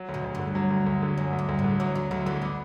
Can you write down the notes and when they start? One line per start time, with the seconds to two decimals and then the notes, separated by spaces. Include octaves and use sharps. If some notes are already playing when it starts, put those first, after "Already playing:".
Already playing: F#3
0.09 D2
0.14 B2
0.24 D2
0.35 G2 D3
0.55 F#3
0.71 D2
0.86 D2
1.02 D3
1.18 F#2 F#3
1.33 D2
1.39 G2
1.49 D2
1.59 A2
1.64 D3
1.80 E3 F#3
1.95 D2 F#3
2.11 D2 F#3
2.26 D3 E3
2.42 D3 B3